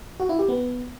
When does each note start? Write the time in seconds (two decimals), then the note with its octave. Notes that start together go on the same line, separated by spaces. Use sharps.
0.20 F#4
0.29 E4
0.39 G4
0.49 B3